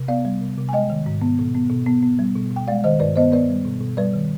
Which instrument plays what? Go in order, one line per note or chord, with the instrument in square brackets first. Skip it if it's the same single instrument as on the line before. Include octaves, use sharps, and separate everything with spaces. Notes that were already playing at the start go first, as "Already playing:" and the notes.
Already playing: [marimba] C3
B3 D5 F5
G3
C3
C3
G#5
G#3 D#5 G5
D#3
G#2
B3
B2
B3
B2
B3
B3
G3
B2
B2
G5
G#3 D5 F5
D#3 C5 D#5
G2 B4 D5
B3 C5 D#5
B3 B4 D5
G3
B2
B2
G3 B4 D5
D#3